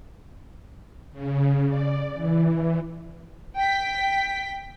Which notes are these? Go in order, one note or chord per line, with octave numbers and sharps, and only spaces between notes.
C#3
D5
E3
G5 B6